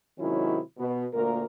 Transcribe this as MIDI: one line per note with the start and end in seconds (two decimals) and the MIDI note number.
0.19 0.58 48
0.19 0.58 51
0.19 0.58 54
0.19 0.58 56
0.19 0.58 61
0.19 0.58 64
0.78 1.05 47
1.14 1.43 38
1.14 1.43 46
1.14 1.43 58
1.14 1.43 70